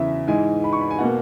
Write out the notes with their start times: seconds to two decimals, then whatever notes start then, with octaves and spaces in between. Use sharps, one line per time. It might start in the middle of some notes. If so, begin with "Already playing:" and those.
Already playing: E2 C#3 E3 E5
0.27 G#2 E3 G#3 G#5
0.64 B5
0.73 C#6
0.81 B5
0.91 G#5
0.99 B2 A#3 F#5